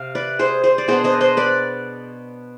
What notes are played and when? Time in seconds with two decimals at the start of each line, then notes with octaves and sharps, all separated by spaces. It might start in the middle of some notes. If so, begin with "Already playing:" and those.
Already playing: C3 F5
0.15 B4 D5
0.39 G#4 C5
0.63 G#4 C5
0.78 D5
0.88 B2 B3 D4 G#4 C5
1.04 C5 D#5
1.21 C5 D#5
1.37 B4 D5